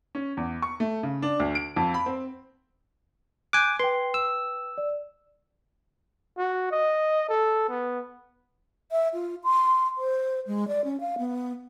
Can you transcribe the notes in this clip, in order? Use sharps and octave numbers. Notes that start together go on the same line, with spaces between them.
C#4
E2
C#6
A3
C#3
D4
D2
D7
F2
B5
C4
G#5 D6 F#6 G6
B4 G5 C6
E6
D5
F#4
D#5
A4
B3
E5
F4
C6
C5
G#3
D5
C#4
F5
B3